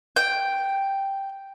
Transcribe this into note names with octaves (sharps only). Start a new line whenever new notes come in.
G5